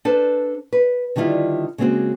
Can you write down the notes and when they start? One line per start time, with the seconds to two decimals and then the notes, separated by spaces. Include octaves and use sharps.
0.05 D4 A4 B4 C5
0.73 B4
1.16 D3 D#3 G3 E4 F4
1.78 C#3 G#3 A#3 C4 F#4